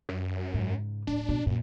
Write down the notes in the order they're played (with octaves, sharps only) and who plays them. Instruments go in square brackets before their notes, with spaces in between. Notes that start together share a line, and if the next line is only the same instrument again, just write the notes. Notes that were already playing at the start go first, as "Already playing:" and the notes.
[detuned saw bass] F#2
[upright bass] G#2 C#3
[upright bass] D1 [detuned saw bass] D4
[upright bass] B2
[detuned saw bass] F#2 [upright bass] A#2